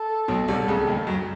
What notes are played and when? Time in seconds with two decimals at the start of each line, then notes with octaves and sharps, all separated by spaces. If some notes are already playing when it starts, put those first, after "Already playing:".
Already playing: A4
0.28 B1 B2
0.48 C2 C3
0.68 C#2 C#3
0.87 D#2 D#3
1.07 F#2 F#3